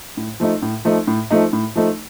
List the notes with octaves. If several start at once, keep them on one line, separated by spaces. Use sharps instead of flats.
A2
F3 A3 D#4
A2
F3 A3 D#4
A2
F3 A3 D#4
A2
F3 A3 D#4